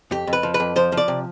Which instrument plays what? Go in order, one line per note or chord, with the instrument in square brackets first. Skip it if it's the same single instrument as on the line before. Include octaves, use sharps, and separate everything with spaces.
[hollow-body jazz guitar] F2 G4
F2
B4
F3
B4
F2
F3 C5
F3
D5
C3